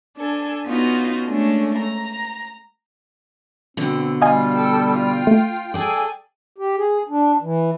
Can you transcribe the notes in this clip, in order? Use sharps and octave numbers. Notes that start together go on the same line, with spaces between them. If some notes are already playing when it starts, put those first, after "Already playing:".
D4 A4 G#5
B3 C#4 D#4 F4 F#4
G#3 A3 C#4 D4
A#5
B2 D3 C4
G3 F4 D#5 F5 G#5
A4 G5
F4 G5
A3
G#4 A4 D5 G5 G#5
G4
G#4
D4
E3